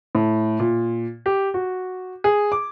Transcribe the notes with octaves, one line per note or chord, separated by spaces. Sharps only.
A2
A#2
G4
F#4
G#4
D6